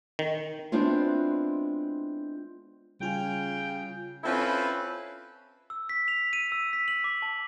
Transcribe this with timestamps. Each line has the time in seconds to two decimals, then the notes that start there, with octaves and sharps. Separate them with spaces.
0.19 D#3
0.72 G#3 B3 C4 D4 E4 F4
3.00 C#3 G3 F4 G5 G#5
4.24 C4 C#4 E4 F4 A4 B4
5.70 E6
5.89 B6
6.08 F7
6.33 D#7
6.52 E6
6.73 B6
6.88 F#7
7.04 D6
7.22 A5